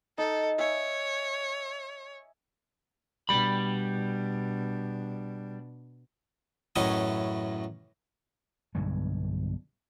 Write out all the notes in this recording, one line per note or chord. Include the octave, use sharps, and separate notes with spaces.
D#4 A4
C#5 E5 G#5
B2 G3 D4 B5
F#2 A2 E3 C#4 D#5 G#5
B1 G2 D3 G#3